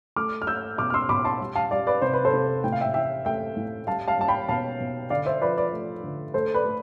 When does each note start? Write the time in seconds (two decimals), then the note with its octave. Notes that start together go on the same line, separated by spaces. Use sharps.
0.16 A3 D6 F6
0.42 F6
0.47 A3 E6 G6
0.78 B2 D6 F6
0.90 F6
0.94 C6 E6
1.09 B2 B5 D6
1.25 A5 C6
1.40 G3
1.55 F5 A5
1.71 G3 D5 F5
1.87 B4 D5
2.02 C3 C5
2.14 B4
2.25 A4 C5
2.33 C3
2.64 A2 G5
2.72 F5
2.81 E5 G5
2.94 E3 E5 G5
3.25 A3 E5 G5
3.56 A2
3.87 G3 F5 A5
4.08 F5 A5
4.18 G3 A5
4.28 G5 B5
4.49 B2 F5 A5
4.80 B2
5.10 D3 D5 F5
5.26 C5 E5
5.42 F3 B4 D5
5.57 B4 D5
5.73 A3
6.04 D3
6.34 A3 A4 C5
6.54 B4 D5
6.65 A3